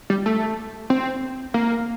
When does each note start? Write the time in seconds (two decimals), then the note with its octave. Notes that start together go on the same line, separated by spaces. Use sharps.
0.10 G3
0.26 A3
0.90 C4
1.54 A#3